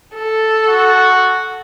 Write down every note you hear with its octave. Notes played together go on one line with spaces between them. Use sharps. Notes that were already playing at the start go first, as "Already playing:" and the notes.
A4
F#4